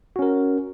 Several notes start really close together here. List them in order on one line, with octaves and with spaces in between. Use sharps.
F#4 C#4 A#4